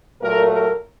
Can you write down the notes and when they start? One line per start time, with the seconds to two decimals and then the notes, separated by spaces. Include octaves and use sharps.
0.21 A#2 F#3 A3 A#4
0.51 A#4